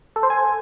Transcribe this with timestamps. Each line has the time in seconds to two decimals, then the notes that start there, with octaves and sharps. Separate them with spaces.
0.16 A4
0.23 C5
0.30 G#5